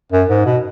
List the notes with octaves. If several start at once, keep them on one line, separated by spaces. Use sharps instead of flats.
F#2
G#2
B2